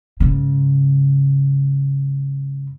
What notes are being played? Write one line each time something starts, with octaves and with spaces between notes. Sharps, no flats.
G#2 C#3